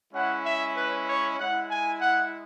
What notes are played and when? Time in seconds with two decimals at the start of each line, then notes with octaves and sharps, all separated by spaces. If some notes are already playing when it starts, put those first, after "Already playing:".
0.12 G#3 C#4 E4 F#5
0.44 E5
0.75 B4
1.07 C#5
1.37 G#3 E4 F#5
1.69 G#5
2.01 F#5